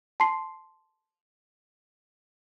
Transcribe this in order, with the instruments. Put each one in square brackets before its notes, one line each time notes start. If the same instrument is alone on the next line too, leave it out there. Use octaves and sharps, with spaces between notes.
[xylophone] A5 C6 C7